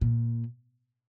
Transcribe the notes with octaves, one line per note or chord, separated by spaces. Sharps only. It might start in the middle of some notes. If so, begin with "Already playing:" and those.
A#2